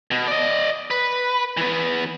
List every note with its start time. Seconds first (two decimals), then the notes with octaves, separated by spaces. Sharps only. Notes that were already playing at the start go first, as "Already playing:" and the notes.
0.11 B2
0.28 D5 D#5
0.90 B4
1.57 E3 B3